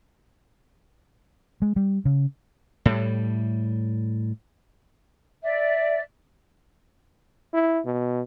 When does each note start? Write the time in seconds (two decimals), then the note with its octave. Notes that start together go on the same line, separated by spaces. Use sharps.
1.62 G#3
1.76 G3
2.05 C#3
2.85 A2 G3
5.42 D5 E5
7.54 E4
7.85 B2